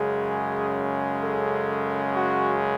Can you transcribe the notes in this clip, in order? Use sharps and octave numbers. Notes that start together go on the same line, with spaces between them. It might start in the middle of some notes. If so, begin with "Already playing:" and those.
Already playing: F#2 C#3 G#3 G#4
A4
F#4